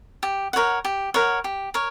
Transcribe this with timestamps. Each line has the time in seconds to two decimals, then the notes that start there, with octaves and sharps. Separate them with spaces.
0.23 G4
0.53 A#4 C#5 F#5
0.85 G4
1.14 A#4 C#5 F#5
1.44 G4
1.74 A#4 C#5